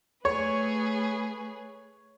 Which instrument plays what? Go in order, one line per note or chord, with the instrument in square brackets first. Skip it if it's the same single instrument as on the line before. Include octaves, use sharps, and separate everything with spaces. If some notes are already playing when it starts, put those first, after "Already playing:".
[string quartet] A3 G#4 B4 [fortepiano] C#5